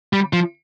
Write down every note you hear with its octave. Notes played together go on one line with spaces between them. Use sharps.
G3
F3